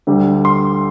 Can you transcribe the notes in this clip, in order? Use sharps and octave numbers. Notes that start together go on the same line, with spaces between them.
D2 D3 G3
C6